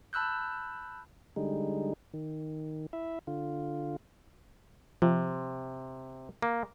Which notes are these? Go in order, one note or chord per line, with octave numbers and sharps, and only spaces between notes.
A5 B5 E6 F#6 G6
D3 G3 G#3 D#4
D#3
E4 E5
D3 F4
C3 F3
A#3